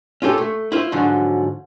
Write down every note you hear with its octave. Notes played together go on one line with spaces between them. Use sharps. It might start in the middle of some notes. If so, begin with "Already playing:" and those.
C#4 F4 G4 A4
A3
E4 F4 C5
G#2 D3 F3 F#3